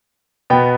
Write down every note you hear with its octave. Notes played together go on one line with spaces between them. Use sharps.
B2 B3 G5